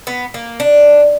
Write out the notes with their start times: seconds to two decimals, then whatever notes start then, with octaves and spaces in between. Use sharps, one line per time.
0.07 B3
0.34 A#3
0.60 D4